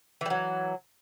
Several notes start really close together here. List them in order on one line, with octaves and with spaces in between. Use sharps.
E3 G3 F#3